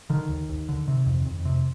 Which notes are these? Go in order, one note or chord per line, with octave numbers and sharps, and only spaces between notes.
D3 D#3
D#2
D#2
D3
C3
F2
F2
C3